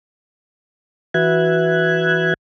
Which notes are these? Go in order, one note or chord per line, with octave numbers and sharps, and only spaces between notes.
E3 F#4 B4 E5 F#6 G#6